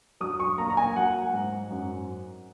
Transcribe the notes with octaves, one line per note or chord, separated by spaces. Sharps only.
F#3 D#6
C#6
A#3 A#5
A#5
G#5
F#3 F#5
G#2
F#2